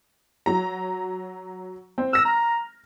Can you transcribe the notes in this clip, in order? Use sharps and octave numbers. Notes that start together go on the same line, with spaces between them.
F#3 A#5
C4
E6 F6 A#6
A#5